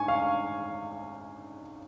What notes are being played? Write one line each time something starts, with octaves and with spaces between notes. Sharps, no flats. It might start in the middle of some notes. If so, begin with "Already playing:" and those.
Already playing: G#2 G#5 C#6
F5